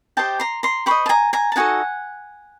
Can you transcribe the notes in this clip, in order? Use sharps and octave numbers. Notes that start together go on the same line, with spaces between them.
G4 C5 D#5 G5 A5
A#5 C6
A#5 C6
G4 C5 D#5 B5 C#6
A5
G#5 A#5
G#5 A#5
A5
D#4 F#4 A4 F#5 G#5